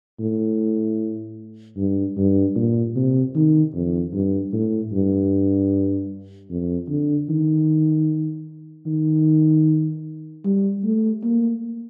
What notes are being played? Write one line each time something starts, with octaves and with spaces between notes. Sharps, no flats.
A2
G2
G2
A#2
C3
D#3
F2
G2
A2
G2
F2
D3
D#3
D#3
G3
A3
A#3